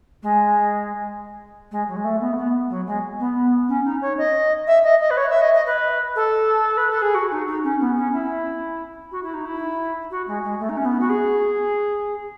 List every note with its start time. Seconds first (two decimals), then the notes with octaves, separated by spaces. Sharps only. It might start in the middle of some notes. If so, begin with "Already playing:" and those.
0.23 G#3
1.71 G#3
1.88 F#3
1.96 G#3
2.04 A3
2.20 B3
2.33 A3
2.37 B3
2.70 F#3
2.86 G#3
3.20 B3
3.69 C#4
3.85 D#4
4.02 C#5
4.18 D#5
4.67 E5
4.84 D#5
5.00 D#5
5.10 B4
5.17 C#5
5.29 E5
5.41 D#5
5.54 D#5
5.66 B4
6.16 A4
6.77 B4
6.90 A4
7.02 G#4
7.14 F#4
7.31 D#4
7.47 D#4
7.64 C#4
7.80 B3
7.97 C#4
8.13 E4
9.12 F#4
9.23 E4
9.34 D#4
9.45 E4
10.11 F#4
10.27 G#3
10.44 G#3
10.60 A3
10.69 D#4
10.77 C#4
10.85 B3
11.00 F#4
11.09 G#4